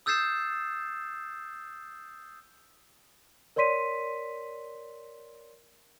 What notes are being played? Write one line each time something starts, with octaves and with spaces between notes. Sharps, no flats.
D#6 E6 G6 A6 C7 E7
A#4 C#5 D5 C6 B6 D#7